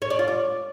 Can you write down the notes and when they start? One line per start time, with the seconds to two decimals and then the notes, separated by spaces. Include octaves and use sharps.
0.02 C#5
0.10 D5
0.19 F4
0.28 D5